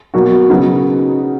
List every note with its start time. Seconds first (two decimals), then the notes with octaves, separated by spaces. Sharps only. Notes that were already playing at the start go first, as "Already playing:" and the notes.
0.14 B2 F#3 A#3 D#4 F#4
0.50 C#3 F#3 B3 D#4